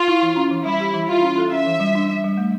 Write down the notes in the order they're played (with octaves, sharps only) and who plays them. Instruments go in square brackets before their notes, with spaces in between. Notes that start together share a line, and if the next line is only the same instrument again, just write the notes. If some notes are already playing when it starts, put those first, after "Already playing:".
Already playing: [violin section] F4
[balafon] E4
E3
C#4
E3
[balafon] G3 [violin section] E4
[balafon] G4
E3
[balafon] E4 [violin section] F4
[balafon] C#4
A4
[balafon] C#4 [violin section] E5
[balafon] E3
G3
D4
G3
G3
A3